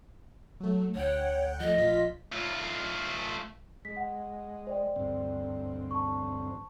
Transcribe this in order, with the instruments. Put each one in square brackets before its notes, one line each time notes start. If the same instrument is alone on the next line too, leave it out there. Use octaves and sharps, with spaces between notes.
[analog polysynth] F#3 A3
[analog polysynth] D2 F#5 G5 [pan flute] C#5
[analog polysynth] F3 A3 [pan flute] D#5
[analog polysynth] A#1 F4 B6
[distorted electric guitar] A3 F4
[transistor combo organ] G#3 [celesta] B6
[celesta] F#5
C5 D5 G5
[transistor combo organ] D2 G2 C4
[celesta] A5 C#6